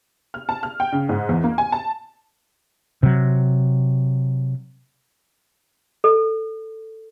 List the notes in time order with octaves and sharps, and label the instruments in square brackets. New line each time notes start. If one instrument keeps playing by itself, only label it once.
[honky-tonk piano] F6
A5
F6
G5
C#3
G#2
E2
A#3
G#5
A5
[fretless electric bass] C3 F#3
[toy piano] A4